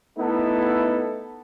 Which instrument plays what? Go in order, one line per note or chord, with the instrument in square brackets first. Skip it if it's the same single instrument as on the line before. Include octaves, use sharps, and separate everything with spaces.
[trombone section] A3 B3 D#4 E4 A4